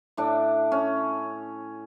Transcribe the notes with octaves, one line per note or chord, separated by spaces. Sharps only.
A2 D4 D6
C#4